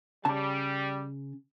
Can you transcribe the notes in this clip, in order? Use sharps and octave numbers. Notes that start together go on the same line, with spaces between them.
C#3 G3 A5